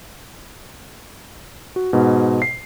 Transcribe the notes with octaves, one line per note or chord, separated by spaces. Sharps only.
F#4
G#2 B2
C7